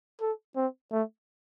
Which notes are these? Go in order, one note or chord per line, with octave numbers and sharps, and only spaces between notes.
A4
C4
A3